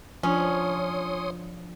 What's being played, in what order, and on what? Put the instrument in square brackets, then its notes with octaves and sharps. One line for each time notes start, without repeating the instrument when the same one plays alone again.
[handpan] F3 D4 [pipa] C#4 [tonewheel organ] C#5 C6 D#6